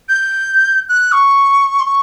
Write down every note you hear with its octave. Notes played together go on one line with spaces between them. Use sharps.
G6
F#6
C#6
C6
C#6